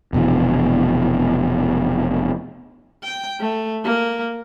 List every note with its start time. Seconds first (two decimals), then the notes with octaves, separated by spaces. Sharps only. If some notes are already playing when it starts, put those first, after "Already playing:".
0.13 F1 B2 D3 E3
3.04 G5
3.40 A3
3.84 A#3